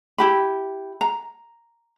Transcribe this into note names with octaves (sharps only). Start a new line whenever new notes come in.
E4 G4 B5
A#5